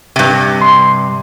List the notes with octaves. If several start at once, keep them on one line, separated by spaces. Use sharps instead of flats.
G2 C3
C6